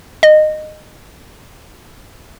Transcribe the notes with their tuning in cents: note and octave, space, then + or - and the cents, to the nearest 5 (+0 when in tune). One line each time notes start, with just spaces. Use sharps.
D#5 -20